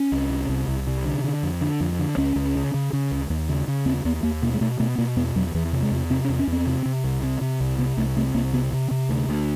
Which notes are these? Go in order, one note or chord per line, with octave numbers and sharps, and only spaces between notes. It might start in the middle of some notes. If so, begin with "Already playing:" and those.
Already playing: C#4
C2
C3
C2
C2
C3
D3
D3
F2
D3
F2
D3
C#2 C#4
C#2
C#3
C#3
C#3
C#2
D#2
C#3
C#3
D#2 C4
D#2 B3
D#2 A#3
B2 A#3
G#3
B2 A3
B2 A3
B2 A#3
E2 B3
E2 F#3
E2 E3
C3
G#3
E2
C3 C4
C#4
E2
C#4
E2
C4
C3
C3
C2
C3
C3
C2
C3 B3
C2 A3
C3 A3
C2 A#3
C3 B3
C3
C3
D2
D2